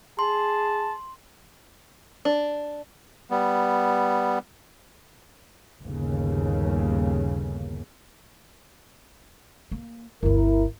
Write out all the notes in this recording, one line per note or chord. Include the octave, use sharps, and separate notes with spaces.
G#4 A5 C6
D4
G3 B3
G1 D#2 C#3
A#3
G1 D2 E4 A#4